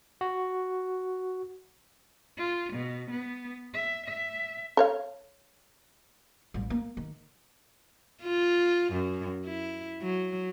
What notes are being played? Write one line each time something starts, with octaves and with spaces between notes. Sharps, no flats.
F#4
F4
B2
B3
E5
E5
A4 C#5 F5
A1 G3
A#3
D#3
F4
F#2
E4
F#3